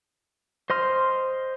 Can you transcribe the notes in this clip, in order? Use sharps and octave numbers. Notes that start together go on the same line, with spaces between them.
C5 D#5 C6 F6